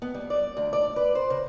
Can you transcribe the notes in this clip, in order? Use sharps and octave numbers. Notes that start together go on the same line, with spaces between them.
B3
G3
D5
D2
D5
B4
C5
C#3